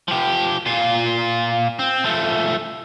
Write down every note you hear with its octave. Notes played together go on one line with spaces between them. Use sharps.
F3 G4
A#2 F4
C4
F3 A3